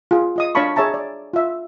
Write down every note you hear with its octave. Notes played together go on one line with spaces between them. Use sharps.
F4 G#4
F4 D#5 D#6
D4 C#5 F5 A5 B5 C#6
G#4 C#5 E5 A5 A#5
D5
F4 E5